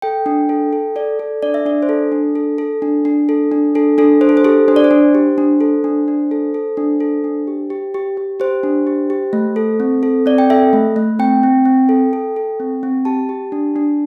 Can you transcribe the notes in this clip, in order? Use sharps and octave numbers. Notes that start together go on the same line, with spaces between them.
A4 G5
D4
A4
A4
A4 D5
A4
D4 D5
E5
D4 D5
C5
A4
D4
A4
A4
D4
D4
A4
D4
D4 A4
D4 A4
D4 C5
A4
C5
G4 A4
D4 C5
D5
C5
D4
G4
D4
A4
D4
D4
A4
A4
D4
A4
D4
G4
G4
G4
G4
G4 C5
D4
G4
G4
A3
A4
C4
A4
C4 D5
G5
A4 E5
A3
A3
C4 G5
C4
C4
A4
A4
A4
C4
C4
G4 A5
G4
D4
D4